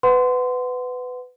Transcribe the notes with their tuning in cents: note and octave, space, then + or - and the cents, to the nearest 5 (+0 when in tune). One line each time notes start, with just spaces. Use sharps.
B4 +20 F#5 +0 C6 -20